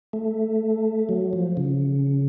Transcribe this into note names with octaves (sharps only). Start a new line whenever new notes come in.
A3
F#3
F3
C#3